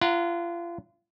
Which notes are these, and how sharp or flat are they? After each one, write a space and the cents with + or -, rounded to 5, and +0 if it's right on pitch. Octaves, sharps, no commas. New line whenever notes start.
F4 -35 F#5 -10 A#5 +0